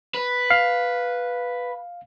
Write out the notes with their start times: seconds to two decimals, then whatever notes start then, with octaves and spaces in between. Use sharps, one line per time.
0.15 B4
0.50 F5